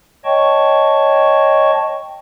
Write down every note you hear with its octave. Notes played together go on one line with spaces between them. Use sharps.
C#5 D#5 G5 A5 C#6